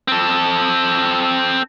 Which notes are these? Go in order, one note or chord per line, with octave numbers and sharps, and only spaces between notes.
C4 A4